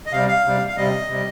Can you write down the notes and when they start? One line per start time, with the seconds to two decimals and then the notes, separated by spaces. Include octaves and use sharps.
0.06 D#5
0.12 C3 G3 F5
0.28 F5
0.45 C3 G3
0.67 F5
0.77 C3 G3 D#5
1.09 C3 G3